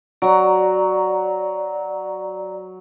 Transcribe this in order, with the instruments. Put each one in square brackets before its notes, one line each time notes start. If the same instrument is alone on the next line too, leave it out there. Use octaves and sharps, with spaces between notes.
[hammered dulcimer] F#3 [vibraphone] D5 A#5